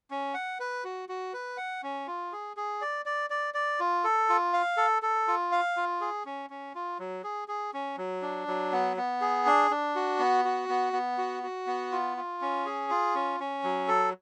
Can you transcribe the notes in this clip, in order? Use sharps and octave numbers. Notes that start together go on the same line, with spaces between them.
C#4
F#5
B4
F#4
F#4
B4
F#5
C#4
F4
G#4
G#4
D5
D5
D5
D5
F4
A4
F4
F5
A4
A4
F4
F5
F4
G#4
C#4
C#4
F4
F#3
G#4
G#4
C#4
F#3
D4
F#3
B3
B3
G#4
D4
D4
F#4
B3
F#4
B3
B3
F#4
F#4
B3
F4
F4
C#4
G#4
F4
C#4
C#4
F#3
A4